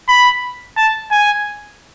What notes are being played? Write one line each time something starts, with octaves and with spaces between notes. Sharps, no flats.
B5
A5
G#5